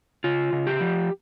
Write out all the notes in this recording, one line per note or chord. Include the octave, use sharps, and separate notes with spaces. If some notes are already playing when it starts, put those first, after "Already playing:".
C#3 F4
C#3
G4
F3